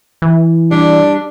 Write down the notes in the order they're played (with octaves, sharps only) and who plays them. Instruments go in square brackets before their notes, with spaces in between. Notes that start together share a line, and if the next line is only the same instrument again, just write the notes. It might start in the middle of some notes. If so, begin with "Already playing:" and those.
[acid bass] E3
[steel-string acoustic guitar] G3 [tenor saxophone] D4